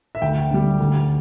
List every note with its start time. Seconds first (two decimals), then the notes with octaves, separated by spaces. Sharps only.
0.15 E5
0.22 D2 G5
0.51 D3 G3
0.80 D2